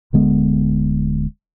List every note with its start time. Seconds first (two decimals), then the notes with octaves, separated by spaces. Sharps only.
0.13 D1 D3 G#3 B3